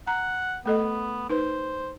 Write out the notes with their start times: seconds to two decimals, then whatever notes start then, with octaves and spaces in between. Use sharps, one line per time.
0.07 F#5 A#5
0.66 A3 B3 A4 D#5
1.30 D#4 B4 C5